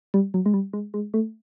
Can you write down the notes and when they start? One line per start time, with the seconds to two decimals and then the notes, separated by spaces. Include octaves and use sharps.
0.14 G3
0.34 F#3
0.46 G#3
0.54 G3
0.73 G#3
0.94 G#3
1.14 A3